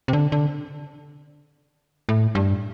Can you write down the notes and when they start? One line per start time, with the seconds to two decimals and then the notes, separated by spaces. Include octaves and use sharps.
0.08 C3
0.13 D3
0.32 D3
2.09 A2
2.35 G2